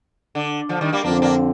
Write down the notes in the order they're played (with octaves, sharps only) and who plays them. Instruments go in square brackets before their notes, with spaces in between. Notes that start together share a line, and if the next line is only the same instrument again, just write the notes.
[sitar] D3
D3 F3
D#3 G3
G3 A#3
[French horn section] F2 D3 F3 C4 [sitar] A#3 D4
[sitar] A#3 D4